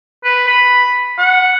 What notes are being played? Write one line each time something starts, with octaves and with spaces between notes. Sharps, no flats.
B4
B5
F#5